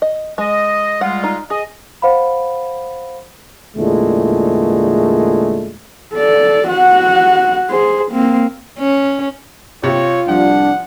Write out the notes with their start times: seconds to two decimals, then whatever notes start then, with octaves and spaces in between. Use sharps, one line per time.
0.02 D#5
0.38 G#3 D#5
1.01 G3 G#3 F4 F#5
1.24 D#4
1.50 G#4 D#5
2.02 C5 F5 F#5 B5
3.77 E2 A#2 D3 G#3 A3
6.15 A4 D5
6.68 F#4 F#5
7.70 G#4 C5
8.12 A#3 C4
8.79 C#4
9.83 C3 F4 C#5
10.28 C2 F3 G3 D4 F#5